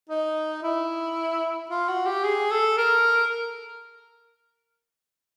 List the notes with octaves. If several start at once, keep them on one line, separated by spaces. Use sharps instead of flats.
D#4
E4
F4
F#4
G4
G#4
A4
A#4